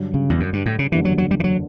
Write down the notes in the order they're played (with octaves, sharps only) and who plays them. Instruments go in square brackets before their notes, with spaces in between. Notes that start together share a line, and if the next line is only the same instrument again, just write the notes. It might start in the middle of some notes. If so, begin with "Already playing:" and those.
Already playing: [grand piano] G2 D3 F#3
[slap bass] C#3
E2
F#2
G2
A2
C#3
[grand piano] F#1 E2 D3 G3 [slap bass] E3
[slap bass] F#3
F#3
G3
E3
F#3